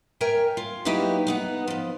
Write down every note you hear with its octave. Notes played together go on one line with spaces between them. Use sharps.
A#4 C#5 E5 G5 G#5
F4
F#3 A#3 B3 D#4 E4 G4
B3 D#4 F#5
F3 B3